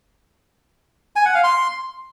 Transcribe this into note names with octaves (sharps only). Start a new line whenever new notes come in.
G#5
F#5
F5
C6